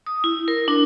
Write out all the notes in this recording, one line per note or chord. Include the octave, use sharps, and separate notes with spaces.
D#6
E4
A#4
D4